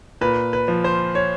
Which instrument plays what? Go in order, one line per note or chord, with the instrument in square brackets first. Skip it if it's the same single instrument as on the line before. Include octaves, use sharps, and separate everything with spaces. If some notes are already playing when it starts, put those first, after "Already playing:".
[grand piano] A#2 B4
B4
F3
C5
C#5